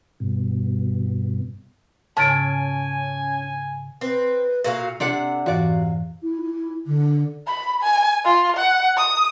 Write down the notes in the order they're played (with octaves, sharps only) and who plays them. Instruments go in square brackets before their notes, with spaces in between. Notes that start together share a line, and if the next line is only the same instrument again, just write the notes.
[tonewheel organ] G2 B2
[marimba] G#2 C#3 [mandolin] C#4 E6 [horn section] G#5 [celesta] A5 A6 D7
[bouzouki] C4 [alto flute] B4
[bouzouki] A#2 F#4 F5 [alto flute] A4
[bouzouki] C3 [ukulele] D4 D5 F#5
[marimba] F2 G#2 E3 [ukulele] F#4 D5 [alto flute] F5
[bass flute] E4
E4
D3
[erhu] B5
G#5
F4
F#5
D#6